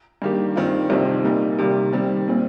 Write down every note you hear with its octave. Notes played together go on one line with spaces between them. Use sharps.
G2 D#3 A#3 G4
G2 D#3 C4 F4
C2 C3 F3 C4 D#4
A#2 G3 A#3 D#4 A#4
C3 D#3 G3 A#3
D#3 G3 C4
A#2 G3 C4